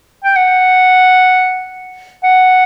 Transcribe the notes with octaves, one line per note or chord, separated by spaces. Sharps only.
G5
F#5
F#5